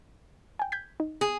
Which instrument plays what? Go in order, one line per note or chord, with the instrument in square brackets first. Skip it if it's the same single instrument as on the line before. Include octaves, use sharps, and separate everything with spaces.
[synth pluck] G5 G#5
G6 G#6 B6
D#4
[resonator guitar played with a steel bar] G#4